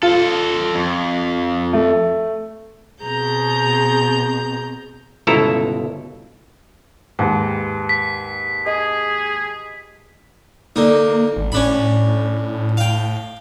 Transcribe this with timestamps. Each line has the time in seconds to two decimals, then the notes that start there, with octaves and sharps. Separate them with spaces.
0.03 F4 A4 C5
0.75 F2
1.73 A3
3.04 B2 C4 G#4 A#5 G6
5.27 G1 C#2 B2 E4 A4 A#5
7.19 D#2 G#2 G4 B4
7.89 B6
8.66 G#4 D#5
10.76 D3 A#3 D#4
11.36 G#1
11.52 A2 C#4 D4 B5
12.77 F5 G5